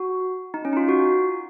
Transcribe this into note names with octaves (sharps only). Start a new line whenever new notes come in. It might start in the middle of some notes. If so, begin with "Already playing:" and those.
Already playing: F#4
D#4
C#4
D#4
F4
F#4